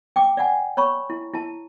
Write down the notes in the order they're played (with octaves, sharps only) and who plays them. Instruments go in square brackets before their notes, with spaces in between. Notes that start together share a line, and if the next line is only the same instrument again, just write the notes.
[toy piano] G5 D6
D5 F#5 G#5
C#5 B5 C#6
E4
E4 A5